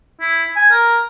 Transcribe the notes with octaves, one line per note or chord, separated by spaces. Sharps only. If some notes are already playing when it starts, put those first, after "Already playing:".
E4
G#5
A#4